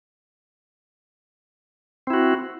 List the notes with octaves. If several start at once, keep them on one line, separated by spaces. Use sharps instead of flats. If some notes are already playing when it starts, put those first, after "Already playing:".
C4 E4 F#4